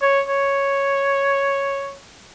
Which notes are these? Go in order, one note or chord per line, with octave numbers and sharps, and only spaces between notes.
C#5
C#5